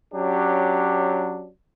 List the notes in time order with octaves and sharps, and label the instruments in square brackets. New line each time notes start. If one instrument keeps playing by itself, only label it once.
[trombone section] F#3 C#4 D4 G4